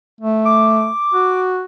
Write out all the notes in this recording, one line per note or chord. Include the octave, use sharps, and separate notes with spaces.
A3
D6
F#4